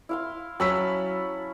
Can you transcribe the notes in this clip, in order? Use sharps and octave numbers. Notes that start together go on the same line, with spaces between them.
E4 F5 C6
F#3 C#4 A5 B5 E6 B6